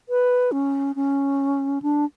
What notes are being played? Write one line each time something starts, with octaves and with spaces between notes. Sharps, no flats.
B4
C#4
C#4
D4